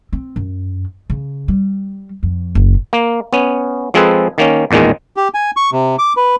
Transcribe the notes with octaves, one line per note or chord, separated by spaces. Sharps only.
C4
F#2
C#3
G3
F2
F#1
A#3
B3 C#4
F3 G#3 C4 G#4 A4 B4
D#3 A#3 C#4
A1 E2 A#2 D#3 G#3
G4
G#5
C#6
C3
D6
B4